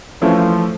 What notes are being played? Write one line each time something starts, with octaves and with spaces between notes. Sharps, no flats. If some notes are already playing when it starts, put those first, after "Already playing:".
E3 F3 A3 C#4 E4